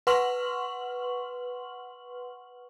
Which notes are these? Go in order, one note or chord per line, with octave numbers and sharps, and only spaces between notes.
B4 F#5 C6 C#6 F6 F#7